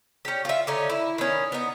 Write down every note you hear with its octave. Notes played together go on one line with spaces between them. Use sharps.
C#4 G4
F4 E5
D3 C#4 D#4
E4
D#3 C#4
B3 D#4